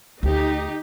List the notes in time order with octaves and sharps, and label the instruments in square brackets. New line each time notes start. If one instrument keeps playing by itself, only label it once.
[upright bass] D2 [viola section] D#4 G4